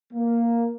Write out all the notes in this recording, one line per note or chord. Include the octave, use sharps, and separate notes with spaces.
A#3